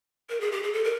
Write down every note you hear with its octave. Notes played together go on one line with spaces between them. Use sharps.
A#4
G#4
G4
G#4
A4
A#4